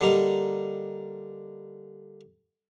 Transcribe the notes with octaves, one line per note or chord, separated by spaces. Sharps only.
D3 G3 A#3 D#4